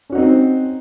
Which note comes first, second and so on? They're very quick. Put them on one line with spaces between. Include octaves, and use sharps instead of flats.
C#4 F#4 D#4 C4